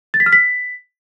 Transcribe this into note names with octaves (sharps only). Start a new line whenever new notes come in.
A6
B6
F6
B6